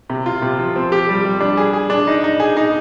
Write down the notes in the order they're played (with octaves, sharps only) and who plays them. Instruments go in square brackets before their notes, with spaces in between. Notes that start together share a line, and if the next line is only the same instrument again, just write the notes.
[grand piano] C3
F4
C3
F3
C4
G4
G3
G3
D4
G#4
G#4
D4
D#4
D#4
G#4
D#4